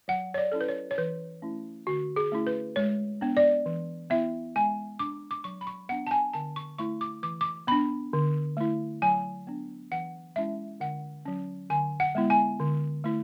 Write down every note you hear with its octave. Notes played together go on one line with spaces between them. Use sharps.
F#3 F#5
C#5
D5
C#4 E4 A4
B4
C#5
C#5
E3 B4
A3 C#4 E4
D3 F#4
G#4
A3 C#4 E4
B4
G#3 C#5
B3 D4
D5
E3
B3 E4 E5
G#3 G#5
D4 D6
D6
F#3 C#6
B5
C#6
B3 D4 F#5
A5
G#5
D3 A5
C#6
A3 E4 C#6
D6
E3 D6
D6
B3 D4 B5
D3
A3 E4
F#3 G#5
B3 D4
E3 F#5
G#3 C#4 E4 E5
D3 F#5
F#3 C#4
D3 G#5
F#5
G#3 B3 E4
G#5
D3
A3 E4